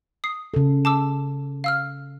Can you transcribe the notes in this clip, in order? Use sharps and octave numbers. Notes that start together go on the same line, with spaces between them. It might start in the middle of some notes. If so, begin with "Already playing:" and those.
D#6 C7
C#3 A4
A5 D6 E6
F5 E6 F6